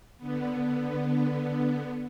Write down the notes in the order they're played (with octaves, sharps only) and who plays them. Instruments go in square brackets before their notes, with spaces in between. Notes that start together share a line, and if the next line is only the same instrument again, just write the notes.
[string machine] D3 B3